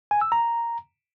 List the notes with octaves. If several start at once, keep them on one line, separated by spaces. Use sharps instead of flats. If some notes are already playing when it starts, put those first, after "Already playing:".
G#5
E6
A#5